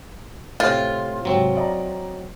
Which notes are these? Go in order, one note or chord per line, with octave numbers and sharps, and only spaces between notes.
A2 C3 F4
G#2 C3 F#3 C4
D5 D#5 A#5